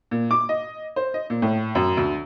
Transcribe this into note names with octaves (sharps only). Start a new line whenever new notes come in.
A#2
D6
D#5
C5
D#5
A#2
A2
F#2
D2